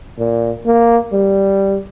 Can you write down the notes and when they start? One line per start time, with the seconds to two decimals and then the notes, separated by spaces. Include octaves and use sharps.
0.19 A#2
0.66 A#3
1.13 G3